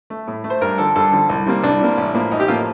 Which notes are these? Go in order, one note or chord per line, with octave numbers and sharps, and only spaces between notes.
A3
A2
A3
C5
G2 A#4
D3 F3 A4
G2 A4
D3 F3
C2
C3 G3 A#3
C2 D4
C3 G3 A#3
A1
A2 F3 A#3
A1 D#4
G4
A2 F3 A#3 F4